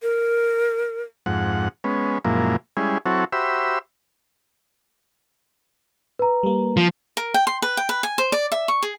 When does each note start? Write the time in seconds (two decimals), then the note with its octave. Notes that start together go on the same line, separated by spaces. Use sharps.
0.02 A#4
1.26 F2 G#2 F#5
1.84 G#3 B3 C#4
2.25 F#2 A#2 F3 G#3 A#3 E4
2.77 G3 G#3 C#4 E4 G#4
3.06 F#3 C4 E4 F#4 A4 C#5
3.32 F#4 G4 C5 E5 B5 E6
6.19 B4 A#5
6.43 G3 A#3
6.77 F3
7.17 A#4
7.34 G5
7.47 C6
7.62 B4
7.77 G5
7.89 B4
8.03 G#5
8.18 C5
8.32 D5
8.52 E5
8.68 C#6
8.83 G#4